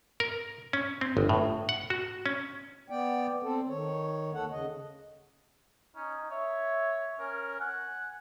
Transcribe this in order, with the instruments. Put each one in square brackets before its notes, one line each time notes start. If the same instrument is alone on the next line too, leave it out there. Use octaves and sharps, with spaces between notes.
[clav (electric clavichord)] A#4
C#4
C4
G1
A2
F#5
F#4
C#4
[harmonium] B3 D5 G5
C4 A4
D#3 C#5
D#2 A4 F#5
C#3 D#5
[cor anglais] C#4 [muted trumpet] D#4
[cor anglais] C#5 [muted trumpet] E5
[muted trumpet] C#4 [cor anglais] A#4
[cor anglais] F#5 [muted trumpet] G#5